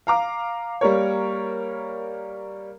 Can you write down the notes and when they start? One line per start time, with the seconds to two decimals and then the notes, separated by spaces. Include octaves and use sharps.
0.07 F5 A#5 D6
0.81 G3 A#3 A#4 C#5